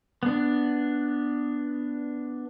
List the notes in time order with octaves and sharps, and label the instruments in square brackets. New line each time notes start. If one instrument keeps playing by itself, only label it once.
[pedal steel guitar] B3 D4